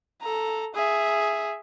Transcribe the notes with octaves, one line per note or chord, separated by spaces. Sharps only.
A4 A#5
G#4 E5